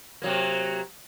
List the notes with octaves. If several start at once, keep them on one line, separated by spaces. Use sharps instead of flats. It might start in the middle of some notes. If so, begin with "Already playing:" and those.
C3 F#3 A#3